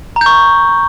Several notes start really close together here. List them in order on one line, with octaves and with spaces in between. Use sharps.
A#5 G6 C#6